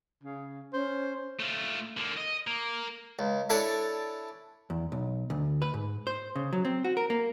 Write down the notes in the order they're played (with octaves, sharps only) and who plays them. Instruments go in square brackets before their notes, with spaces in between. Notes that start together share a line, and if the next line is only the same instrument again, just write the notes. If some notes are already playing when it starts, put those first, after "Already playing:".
[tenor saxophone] C#3
[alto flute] C#4 [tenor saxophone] C5
[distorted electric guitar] A3 F4
D3 A#3
D#5
A#3
[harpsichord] C#2
D4 E4 A4 C#5 D5 G#5
[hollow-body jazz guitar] E2
B1
D2
B4
G#2
C5
C#3
F#3
C4
F#4
A#4
A#3